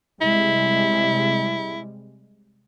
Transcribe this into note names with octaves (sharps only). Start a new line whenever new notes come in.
C3 G3 G#3 E4